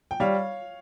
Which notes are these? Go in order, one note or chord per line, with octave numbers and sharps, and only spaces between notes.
G5
G3 C#5 F5